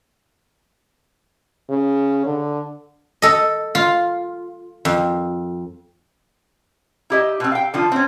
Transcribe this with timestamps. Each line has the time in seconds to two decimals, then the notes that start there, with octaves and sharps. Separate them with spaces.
1.70 C#3
2.25 D3
3.22 A4 D#5
3.75 F4
4.85 F2
7.10 E4 G4 D#5
7.40 B2 C4
7.52 F5 G5
7.74 D3 F3 F4
7.92 C4 C#4